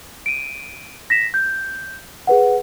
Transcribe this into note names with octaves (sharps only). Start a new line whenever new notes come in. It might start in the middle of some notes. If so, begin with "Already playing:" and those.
D7 D#7
A#6 B6 E7
G6
G#4 B4 F#5